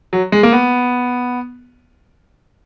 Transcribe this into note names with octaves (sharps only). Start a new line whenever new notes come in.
F#3
G#3
A#3
B3